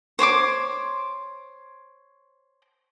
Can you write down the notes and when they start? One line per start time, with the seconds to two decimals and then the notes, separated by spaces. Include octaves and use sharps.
0.19 C5 C#5 C6 D6